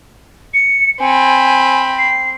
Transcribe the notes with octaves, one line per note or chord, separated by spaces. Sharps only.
C#7
C4 G#5 B5
C7